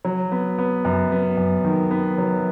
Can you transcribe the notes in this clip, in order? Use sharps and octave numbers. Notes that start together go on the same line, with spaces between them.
F#3
B3
B3
F#2
B3
F#2
D#3
B3
F#3